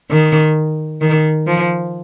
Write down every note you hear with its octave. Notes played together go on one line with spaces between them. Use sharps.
D#3
D#3
F3